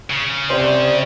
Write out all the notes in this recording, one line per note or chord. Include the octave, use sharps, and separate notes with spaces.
C#3
C3 C5 D5